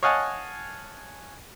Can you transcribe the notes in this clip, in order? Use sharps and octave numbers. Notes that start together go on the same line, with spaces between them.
C#5 D#5 F5 F#5 G#5 A5